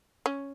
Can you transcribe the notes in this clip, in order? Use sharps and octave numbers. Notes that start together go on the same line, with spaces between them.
C#4